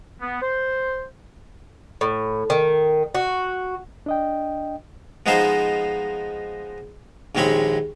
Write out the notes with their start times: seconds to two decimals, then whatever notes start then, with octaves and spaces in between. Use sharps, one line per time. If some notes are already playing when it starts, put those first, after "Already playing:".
0.21 B3
0.42 C5
2.01 A2
2.50 D#3
3.15 F#4
4.06 D4 D#5 G5
5.26 F3 G#3 B3 D#4 C5 F5
7.35 A#1 D#2 G#3 C4 C#5 B5